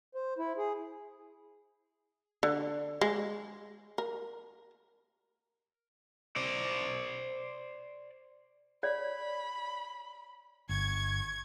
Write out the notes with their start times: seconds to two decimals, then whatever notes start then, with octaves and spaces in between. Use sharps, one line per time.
0.15 C5
0.38 E4
0.58 G#4
2.43 D3
3.01 G#3
3.98 A#4
6.36 C5 D5
8.83 C#5 D5 B5
10.69 G1 C#6 G#6